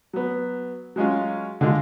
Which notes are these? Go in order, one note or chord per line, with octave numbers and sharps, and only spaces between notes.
F#3 B3
F#3 G#3 C#4 F4
D3 G#3 F4